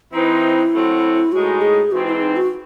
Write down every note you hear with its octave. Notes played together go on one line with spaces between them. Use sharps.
E3 C4 D#4 E4
A2 F#3 C4 F#4
A2 G#3 D#4 F#4
G#4
G#2 E3 G#3 C4 F#4
E4
D#4
F#4